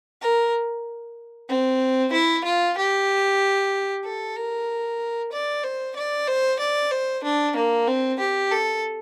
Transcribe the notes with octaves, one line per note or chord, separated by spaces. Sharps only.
A#4
C4
E4
F4
G4
A4
A#4
D5
C5
D5
C5
D5
C5
D4
A#3
C4
G4
A4